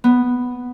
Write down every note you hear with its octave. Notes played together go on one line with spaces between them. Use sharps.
B3